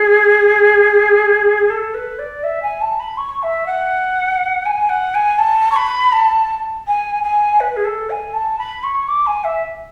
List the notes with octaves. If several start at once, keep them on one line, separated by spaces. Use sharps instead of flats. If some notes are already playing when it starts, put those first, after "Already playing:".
Already playing: G#4
A4
B4
D5
E5
G#5
A5
B5
C#6
E5
F#5
G#5
F#5
G#5
A5
C#6
B5
A5
G#5
G#5
B4
G#4
A4
G#5
A5
B5
C#6
D6
G#5
E5